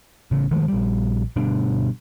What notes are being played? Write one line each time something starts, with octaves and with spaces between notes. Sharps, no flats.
A1 C#3
D#3 F3 G#3 A3
A#1 G3
G1 B2 G3 D4